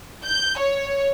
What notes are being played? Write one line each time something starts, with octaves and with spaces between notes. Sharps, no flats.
G6
C#5